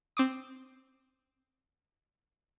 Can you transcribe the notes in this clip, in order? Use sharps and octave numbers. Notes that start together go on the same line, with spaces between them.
C4 D6 D#6